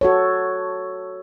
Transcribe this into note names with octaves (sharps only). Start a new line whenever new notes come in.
F#4 A4 C#5